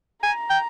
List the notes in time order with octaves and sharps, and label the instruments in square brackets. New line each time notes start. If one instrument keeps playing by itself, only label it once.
[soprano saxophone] G#5 [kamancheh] A#5
[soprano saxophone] G5